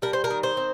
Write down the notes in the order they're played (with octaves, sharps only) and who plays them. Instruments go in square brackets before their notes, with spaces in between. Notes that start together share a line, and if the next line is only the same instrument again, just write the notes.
[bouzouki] G3 A#4
C5
A#4
D#3
C5
C4